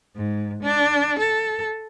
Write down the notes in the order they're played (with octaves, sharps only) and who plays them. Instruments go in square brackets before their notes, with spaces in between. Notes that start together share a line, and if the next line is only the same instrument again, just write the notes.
[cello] G#2
D4
A4